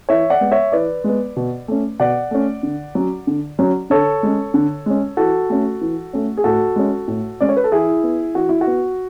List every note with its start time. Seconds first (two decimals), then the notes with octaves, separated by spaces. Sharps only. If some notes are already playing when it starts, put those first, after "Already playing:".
0.09 E3 C#5 E5
0.30 D5 F#5
0.41 G#3 B3
0.52 C#5 E5
0.72 E3 B4 D5
1.04 G#3 B3
1.36 B2
1.68 A3 C#4
2.00 B2 D5 F#5
2.31 A3 C#4
2.63 D3
2.95 F#3 C#4
3.27 D3
3.59 F#3 C#4
3.90 D3 A4 C#5
4.23 G#3 C#4
4.54 D3
4.86 G#3 C#4
5.17 E3 F#4 A4
5.50 A3 C#4
5.81 E3
6.13 A3 C#4
6.37 G#4
6.44 A2 F#4 A4
6.76 G#3 C#4
7.08 A2
7.41 G#3 C#4 D5
7.49 C#5
7.56 B4
7.64 A4
7.72 E3 E4 G#4
8.03 B3
8.35 E3 F#4
8.49 E4
8.61 F#4
8.67 B3